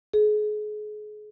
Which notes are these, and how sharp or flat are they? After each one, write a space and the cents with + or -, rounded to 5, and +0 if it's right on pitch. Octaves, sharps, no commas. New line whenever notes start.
G#4 +35